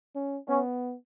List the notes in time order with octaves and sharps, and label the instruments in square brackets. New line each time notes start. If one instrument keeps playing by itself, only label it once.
[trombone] C#4
[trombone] B3 [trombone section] C#4